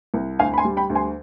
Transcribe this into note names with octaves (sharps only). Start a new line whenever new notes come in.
C2
D2 F5 G#5
B5
G#5 C6
G3
G5 B5
D2
G#5 C6